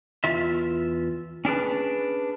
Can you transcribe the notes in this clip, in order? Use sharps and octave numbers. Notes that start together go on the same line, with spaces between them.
E2 F4 E5
C#4 D4 G#4 B4